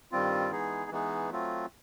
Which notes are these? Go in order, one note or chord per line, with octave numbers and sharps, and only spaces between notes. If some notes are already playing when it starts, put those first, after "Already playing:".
G2 D#3 G3 C4 F4
E3 G#3 B3 D#4 G#4
E3 G#3 B3 D#4 G#4
F#3 A3 C4 F4